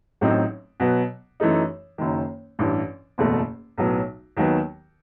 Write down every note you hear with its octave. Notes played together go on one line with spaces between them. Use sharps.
A1 A2 F#3 C4 D#4
B2 F#3 B3
F#2 E3 A3 D#4
F#1 F#2 D#3
A1 G2 E3
F#1 E2 B2 A3
B1 A2 F#3 B3
D#2 D#3 F#3 B3